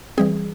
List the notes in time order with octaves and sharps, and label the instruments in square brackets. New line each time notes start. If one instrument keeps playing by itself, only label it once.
[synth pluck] E3 G3 C4 G#4